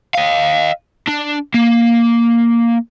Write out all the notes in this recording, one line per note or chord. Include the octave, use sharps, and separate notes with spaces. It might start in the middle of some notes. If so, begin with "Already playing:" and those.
D#5 F5
D4
A#3